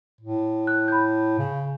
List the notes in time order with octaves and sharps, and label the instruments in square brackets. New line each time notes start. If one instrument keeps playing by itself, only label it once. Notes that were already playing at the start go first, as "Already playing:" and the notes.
[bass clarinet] A2
[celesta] F#6
B5 G6
[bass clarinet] C#3